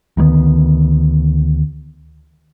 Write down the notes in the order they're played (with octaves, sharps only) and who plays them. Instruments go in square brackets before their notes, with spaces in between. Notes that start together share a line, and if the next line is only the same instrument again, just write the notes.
[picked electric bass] D2 D#3 G3 B3